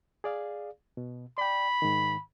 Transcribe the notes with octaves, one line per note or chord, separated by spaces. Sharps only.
G#4 D5 F5
B2
D5 G5 B5
G#2 D#3